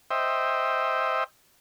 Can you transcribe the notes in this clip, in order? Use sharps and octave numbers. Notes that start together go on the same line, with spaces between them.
C5 D#5 E5 G5